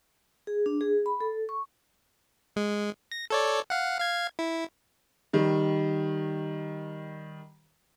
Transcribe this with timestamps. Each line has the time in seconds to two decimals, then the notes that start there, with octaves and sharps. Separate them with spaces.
0.47 G#4
0.66 D4
0.81 G#4
1.06 B5
1.21 A4
1.49 C#6
2.56 G#3
3.12 A#6
3.30 A4 C#5 D5
3.70 F5 F#5
4.00 F5 G#6
4.39 E4
5.33 D#3 G3